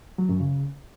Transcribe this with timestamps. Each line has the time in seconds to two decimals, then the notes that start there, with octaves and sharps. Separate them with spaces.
0.18 F#3
0.29 F#2
0.40 C#3